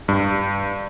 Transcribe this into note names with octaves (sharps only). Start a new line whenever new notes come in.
G2